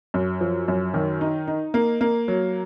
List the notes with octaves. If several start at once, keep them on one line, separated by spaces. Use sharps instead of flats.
F#2
F3
F#2
D#3
D#4
D#4
A#3
A#3
F#3